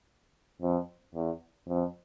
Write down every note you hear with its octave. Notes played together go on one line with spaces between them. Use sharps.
F2
E2
F2